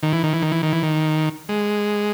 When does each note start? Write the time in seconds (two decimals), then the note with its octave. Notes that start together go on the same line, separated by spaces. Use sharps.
0.03 D#3
0.13 E3
0.23 D#3
0.33 E3
0.42 D#3
0.52 E3
0.63 D#3
0.73 E3
0.83 D#3
1.49 G#3